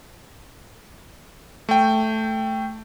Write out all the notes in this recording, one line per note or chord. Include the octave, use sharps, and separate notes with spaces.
A3 G5